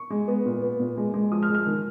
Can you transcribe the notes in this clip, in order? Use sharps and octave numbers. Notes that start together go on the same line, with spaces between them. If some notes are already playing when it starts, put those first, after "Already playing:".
Already playing: C#6
G#3
B3
A#2
B3
A#2
G#3
G#3
F3 D#6
F6
G#3
F6
D#3